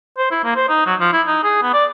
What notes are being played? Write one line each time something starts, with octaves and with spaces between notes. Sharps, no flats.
C5
E4
A#3
C5
D#4
F#3
F3
E4
D#4
G#4
B3
D5